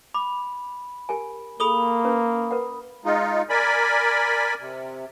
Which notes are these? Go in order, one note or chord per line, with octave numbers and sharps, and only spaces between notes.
B5 D6
G4 A#4 G#5
A#3 G#4 A4 B5 D#6 G7
C#4 B4
A#4 B4 F#5
G#3 D#4 F4
A#4 D5 G#5 B5
C3